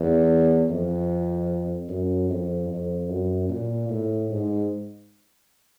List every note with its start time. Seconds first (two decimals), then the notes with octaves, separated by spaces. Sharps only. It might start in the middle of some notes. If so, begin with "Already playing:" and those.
Already playing: E2
0.70 F2
1.89 F#2
2.30 F2
2.70 F2
3.09 F#2
3.49 A#2
3.89 A2
4.31 G#2